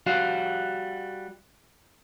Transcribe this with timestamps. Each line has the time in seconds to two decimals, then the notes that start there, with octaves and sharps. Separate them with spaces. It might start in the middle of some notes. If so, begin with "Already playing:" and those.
0.06 G3 F#4 F5